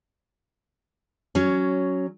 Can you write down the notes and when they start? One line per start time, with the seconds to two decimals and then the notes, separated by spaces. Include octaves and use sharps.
1.35 F#3 C#4